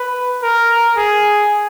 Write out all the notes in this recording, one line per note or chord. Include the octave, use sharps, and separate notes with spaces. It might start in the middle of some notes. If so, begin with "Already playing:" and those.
Already playing: B4
A#4
G#4